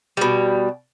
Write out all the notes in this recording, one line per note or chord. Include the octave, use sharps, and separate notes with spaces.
B2 G3